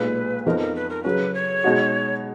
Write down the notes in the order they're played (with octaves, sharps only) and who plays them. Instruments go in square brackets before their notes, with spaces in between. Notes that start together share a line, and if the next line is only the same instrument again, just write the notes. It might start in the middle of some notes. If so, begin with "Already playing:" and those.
Already playing: [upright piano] B1 A#2 G#3 [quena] B4
[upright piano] F2 F3 B3 D#4 [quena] A#4
[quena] A#4
B4
A#4
[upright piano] C#3 F#3 C#4 [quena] B4
[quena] C#5
[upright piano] B2 G#3 D#4 F#4